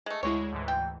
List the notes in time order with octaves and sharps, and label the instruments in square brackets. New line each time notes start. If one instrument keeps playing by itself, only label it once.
[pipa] G#3 A3
[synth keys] D2 G#3 E4 [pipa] C#5
[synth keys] D2 G#2 E3
[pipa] G5